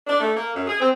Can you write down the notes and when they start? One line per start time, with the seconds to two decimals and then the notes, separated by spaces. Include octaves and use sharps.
0.06 D4
0.20 A3
0.35 A#3
0.55 F#2
0.67 G#4
0.80 C4